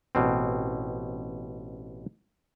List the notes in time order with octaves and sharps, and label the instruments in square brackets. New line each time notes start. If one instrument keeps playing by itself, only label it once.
[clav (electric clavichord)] A1 B2 C4